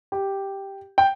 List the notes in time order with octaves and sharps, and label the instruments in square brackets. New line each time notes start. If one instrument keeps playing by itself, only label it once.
[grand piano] G4
G5